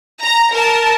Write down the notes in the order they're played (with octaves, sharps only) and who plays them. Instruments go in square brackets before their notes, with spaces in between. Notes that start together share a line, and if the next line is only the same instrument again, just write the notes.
[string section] A#5
A#4 A5